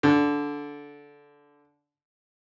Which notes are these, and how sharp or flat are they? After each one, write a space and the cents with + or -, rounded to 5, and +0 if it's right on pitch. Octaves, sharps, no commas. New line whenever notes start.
D3 -15